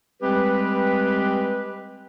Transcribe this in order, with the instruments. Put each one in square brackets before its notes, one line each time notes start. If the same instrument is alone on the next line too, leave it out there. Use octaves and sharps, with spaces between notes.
[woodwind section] G3 G#3 C4 G4 B4